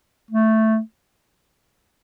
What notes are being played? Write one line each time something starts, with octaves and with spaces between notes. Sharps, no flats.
A3